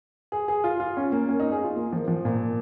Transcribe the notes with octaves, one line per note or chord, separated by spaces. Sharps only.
G#4
G#4
F4
F4
C#4
A#3
C#4
D#4
G#4
F4
A#3
F3
F3
A#2